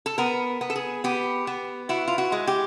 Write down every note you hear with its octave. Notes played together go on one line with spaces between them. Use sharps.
A4
B3 A#4
B3
A4
G#4
B3 G4
B3
E4 F#4
F4
F#4
G#3
G4